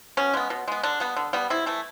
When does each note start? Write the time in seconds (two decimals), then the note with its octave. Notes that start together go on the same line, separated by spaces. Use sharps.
0.17 B2 C#4
0.34 G#3 B3
0.50 B2
0.68 G#3 B3
0.83 D3 D4
1.00 G3 B3
1.16 D3
1.33 G3 B3
1.50 C3 E4
1.66 E3 A3